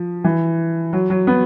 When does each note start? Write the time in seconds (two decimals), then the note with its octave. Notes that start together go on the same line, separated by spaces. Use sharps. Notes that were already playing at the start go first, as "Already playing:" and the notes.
Already playing: F3
0.24 E3
0.93 F#3
1.10 F#3
1.27 B3